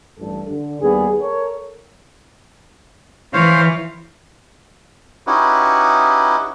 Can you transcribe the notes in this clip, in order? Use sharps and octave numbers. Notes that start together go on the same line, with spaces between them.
A1 G2 A4
D3
D#2 G3 B3 G#4
A4 A#4 C#5
E3 C5 C#5 F5
C#4 D#4 E4 F#4 G4 B4